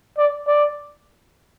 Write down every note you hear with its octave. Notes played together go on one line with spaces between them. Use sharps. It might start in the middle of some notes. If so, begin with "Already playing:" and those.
D5
D5